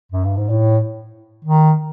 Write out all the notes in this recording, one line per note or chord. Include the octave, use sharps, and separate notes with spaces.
F#2
G2
G#2
A2
D#3